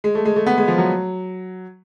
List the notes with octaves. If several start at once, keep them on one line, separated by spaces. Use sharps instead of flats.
G#3
A3
G#3
A3
B3
G#3
F3
F#3